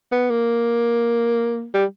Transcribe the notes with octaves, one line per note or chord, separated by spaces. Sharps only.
B3
A#3
G3